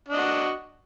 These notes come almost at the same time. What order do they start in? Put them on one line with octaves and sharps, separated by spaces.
D4 D#5 F#4